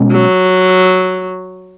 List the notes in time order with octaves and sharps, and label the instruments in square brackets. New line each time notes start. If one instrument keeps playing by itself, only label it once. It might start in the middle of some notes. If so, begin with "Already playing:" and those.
Already playing: [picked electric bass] B2 G#3 C#4
[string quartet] F#3